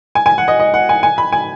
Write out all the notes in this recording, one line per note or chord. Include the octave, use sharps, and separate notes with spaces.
G#5
G#5
F#5
D#5
D#5
F#5
G#5
G#5
B5
G#5